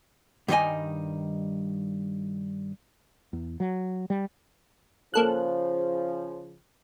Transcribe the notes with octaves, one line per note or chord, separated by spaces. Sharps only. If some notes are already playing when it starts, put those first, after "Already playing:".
G2 D#3 G3 D#4 D#5 G#5
E2
F#3
G3
C#3 F3 A#3 A4 F#6